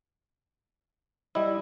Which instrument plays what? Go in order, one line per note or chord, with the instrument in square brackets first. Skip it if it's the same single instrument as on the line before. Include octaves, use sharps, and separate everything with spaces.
[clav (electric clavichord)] G3 E4 [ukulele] D#5